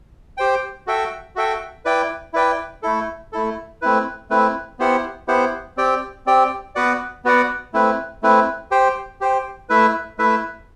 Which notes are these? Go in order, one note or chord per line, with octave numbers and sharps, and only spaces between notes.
G4 C5 G5
F#4 A4 E5 G5
F#4 A4 E5 G5
E4 B4 D5 G5
E4 B4 D5 G5
A3 E4 A4
A3 E4 A4
A3 C4 E4 B4
A3 C4 E4 B4
B3 E4 G4 C5 F#5
B3 E4 G4 C5 F#5
C4 G4 D5 G5
C4 G4 D5 G5
B3 F#4 B4 D5 F#5
B3 F#4 B4 D5 F#5
A3 C4 E4 B4
A3 C4 E4 B4
G4 C5 G5
G4 C5 G5
A3 E4 B4 E5
A3 E4 B4 E5